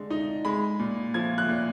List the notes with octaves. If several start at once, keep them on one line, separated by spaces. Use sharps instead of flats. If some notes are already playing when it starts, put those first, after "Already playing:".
Already playing: D3 G#3
D#4
G#3 B5
A#2
F3 G#6
F#6
A#2